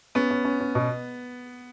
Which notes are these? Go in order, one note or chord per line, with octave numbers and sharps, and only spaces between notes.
B3 C#4
C#4
C#4
C#4
B2